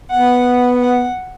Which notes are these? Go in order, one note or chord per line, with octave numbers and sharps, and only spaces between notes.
B3 F#5
F#5